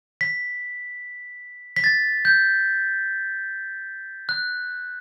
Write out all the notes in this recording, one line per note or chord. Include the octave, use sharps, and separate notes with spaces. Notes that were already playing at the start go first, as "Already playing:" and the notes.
B6
B6
A6
G6
F#6